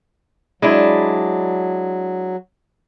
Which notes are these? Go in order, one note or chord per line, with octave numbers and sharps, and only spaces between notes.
F#3 G#3 D4 E4